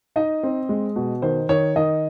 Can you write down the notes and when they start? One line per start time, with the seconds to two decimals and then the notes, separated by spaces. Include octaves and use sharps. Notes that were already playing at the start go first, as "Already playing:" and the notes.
0.16 D#4 D#5
0.43 C4
0.69 G#3
0.96 B2
1.22 D#3 C5
1.49 D#3 C#5
1.76 D#3 D#5